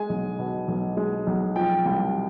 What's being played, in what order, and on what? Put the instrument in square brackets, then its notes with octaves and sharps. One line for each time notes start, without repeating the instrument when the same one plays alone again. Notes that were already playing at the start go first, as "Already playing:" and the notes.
Already playing: [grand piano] G#3 G#5
B1
B2
B1
G#3
B1
F3 G5
C2